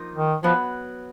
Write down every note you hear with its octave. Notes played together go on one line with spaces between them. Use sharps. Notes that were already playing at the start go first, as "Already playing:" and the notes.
Already playing: F3 A#3 D#4
D#3
F3 F#3 B3